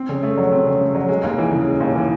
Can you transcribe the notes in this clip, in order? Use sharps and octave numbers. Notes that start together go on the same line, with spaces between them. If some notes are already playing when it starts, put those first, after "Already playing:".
Already playing: C4
C#3
A3
F#3
C4
C#3
A3
F#3
G#3
D#2
E3
C#3
G#3
D#2
E3